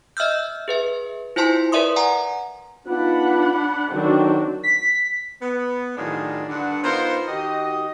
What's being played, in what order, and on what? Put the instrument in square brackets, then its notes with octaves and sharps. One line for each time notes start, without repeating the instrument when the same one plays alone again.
[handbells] D#5 E5 E6 F6 G6
G#4 B4 E5
E4 F4 C5 G#5 A5 C6
A#4 B4 D5 E5 C6 D#6
F#5 G#5 A#5
[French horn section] B3 D#4 F4 [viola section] D4 F#5 B5
[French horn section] D3 D#3 F#3 [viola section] C4 D4 F#4
[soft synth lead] B6
[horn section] B3
A2 D#3 F#3 D4 F4 G#4
G2 D3 F#5
B3 D#4 F4 A#4 C5
D#3 F#4 G4 D#5